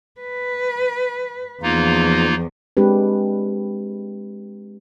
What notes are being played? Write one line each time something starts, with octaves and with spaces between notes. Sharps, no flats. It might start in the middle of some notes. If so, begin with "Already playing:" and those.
B4
E2 F3 A#3 D#4 F4
G#3 C4 D4 G4 B4